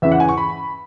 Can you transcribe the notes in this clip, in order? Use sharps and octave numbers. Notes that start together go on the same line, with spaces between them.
E2 C#3 E3 E5
F#5
G#5
C#6
B5